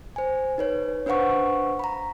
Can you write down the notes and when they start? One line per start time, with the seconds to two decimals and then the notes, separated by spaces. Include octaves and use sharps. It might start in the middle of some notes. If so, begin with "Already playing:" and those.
0.16 C5 G#5
0.58 D#4 B4 C#5
1.06 D4 B4 C5 F5 F#5 C#6
1.79 A#5 B5